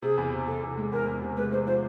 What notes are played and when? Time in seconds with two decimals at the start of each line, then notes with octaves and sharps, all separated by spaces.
0.02 C3 G#4
0.17 E2
0.33 C3
0.47 C3 A4
0.63 E2
0.77 G#3
0.92 E2 A#4
1.07 E2
1.22 C3
1.37 G#3 B4
1.52 G#3 C5
1.67 F3 C5